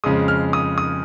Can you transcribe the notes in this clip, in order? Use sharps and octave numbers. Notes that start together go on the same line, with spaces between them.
F2 C#3 G#3 D#6
F6
D#6
D#6